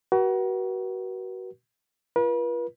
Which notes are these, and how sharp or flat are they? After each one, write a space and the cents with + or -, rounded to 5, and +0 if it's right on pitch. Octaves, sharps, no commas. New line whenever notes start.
F#4 +30 B4 -45
F4 -30 B4 -40